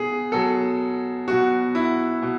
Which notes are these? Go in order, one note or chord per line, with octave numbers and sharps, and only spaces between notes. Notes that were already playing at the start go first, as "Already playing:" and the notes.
Already playing: B2 G#4
B2 F#3 A4
B2 F#3 F#4
E4
B2